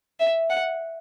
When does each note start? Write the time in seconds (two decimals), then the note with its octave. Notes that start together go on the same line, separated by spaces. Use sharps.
0.20 E5
0.50 F#5